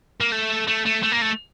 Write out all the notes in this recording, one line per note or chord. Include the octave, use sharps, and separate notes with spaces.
A#3
A3
A3
A3
A3
A#3
A3